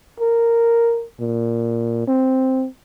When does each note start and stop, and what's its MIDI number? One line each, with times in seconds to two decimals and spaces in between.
0.20 1.04 70
1.20 2.03 46
2.07 2.66 60